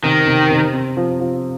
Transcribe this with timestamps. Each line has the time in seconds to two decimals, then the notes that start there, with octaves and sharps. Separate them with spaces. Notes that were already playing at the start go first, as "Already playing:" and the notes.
0.03 C3 D#3
0.27 C3
0.50 C3
0.73 C4
0.97 F3
1.20 F3